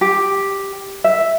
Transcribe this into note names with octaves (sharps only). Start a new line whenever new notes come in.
G4
E5